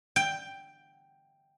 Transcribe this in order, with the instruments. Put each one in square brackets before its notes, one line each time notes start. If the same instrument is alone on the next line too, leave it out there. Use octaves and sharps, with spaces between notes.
[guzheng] G5